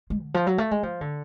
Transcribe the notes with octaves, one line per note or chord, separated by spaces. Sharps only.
G#3
D3
F3
F#3
A3
G#3
F3
D3